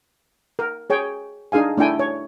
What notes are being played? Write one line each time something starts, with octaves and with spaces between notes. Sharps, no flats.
A#4
G#4 C#5 G5
D4 D#4 G#4 F5 G#5
A3 D4 E4 G5 G#5
C#5